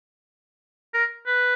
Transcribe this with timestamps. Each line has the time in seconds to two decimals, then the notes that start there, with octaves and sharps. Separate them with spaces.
0.94 A#4
1.27 B4